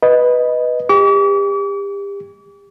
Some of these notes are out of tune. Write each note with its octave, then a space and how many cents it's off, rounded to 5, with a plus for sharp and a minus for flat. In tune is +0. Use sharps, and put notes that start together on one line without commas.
B4 +0 D#5 +0
G4 +35 D6 -45